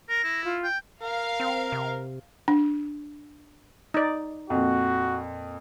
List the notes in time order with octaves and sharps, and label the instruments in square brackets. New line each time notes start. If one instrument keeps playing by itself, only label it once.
[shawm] A#4 [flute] A#6
[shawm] E4
[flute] F4
[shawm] G5
[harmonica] A#4 [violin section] F5
[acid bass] C4
C3
[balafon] D4
[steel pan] D#4 D5
[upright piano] F2 A#2 [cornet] F#4